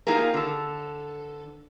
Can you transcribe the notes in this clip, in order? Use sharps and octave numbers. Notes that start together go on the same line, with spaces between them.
A#3 D#4 F4 G4 G#4 A#4
D3 A4